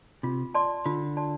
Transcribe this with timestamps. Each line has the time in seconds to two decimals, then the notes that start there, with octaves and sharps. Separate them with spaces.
0.23 C3 F4
0.54 D5 A5 C6
0.85 D3 F4
1.17 D5 A5 C6